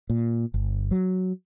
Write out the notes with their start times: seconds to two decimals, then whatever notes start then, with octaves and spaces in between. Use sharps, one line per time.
0.10 A#2
0.54 G1
0.91 F#3